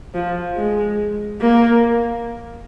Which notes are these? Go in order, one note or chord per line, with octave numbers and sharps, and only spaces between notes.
F3
G#3
A#3